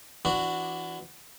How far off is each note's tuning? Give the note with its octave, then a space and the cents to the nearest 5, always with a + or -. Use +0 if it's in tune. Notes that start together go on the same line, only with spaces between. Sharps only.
E3 +25 D4 +0 F#4 +0